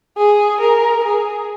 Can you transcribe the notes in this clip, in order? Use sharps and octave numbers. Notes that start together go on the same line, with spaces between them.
G#4
A#4
G#4